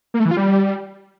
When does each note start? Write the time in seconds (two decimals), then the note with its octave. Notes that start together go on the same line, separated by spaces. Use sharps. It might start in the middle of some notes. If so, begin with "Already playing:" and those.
0.14 A#3
0.20 A3
0.25 E3
0.31 F4
0.37 G3